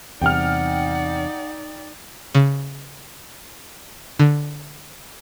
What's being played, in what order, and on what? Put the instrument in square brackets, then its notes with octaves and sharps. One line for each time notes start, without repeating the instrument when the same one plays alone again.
[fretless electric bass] E2 C3 G3 [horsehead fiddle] D#4 D5 [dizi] F#5 [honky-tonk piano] G5 F6
[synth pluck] C#3
D3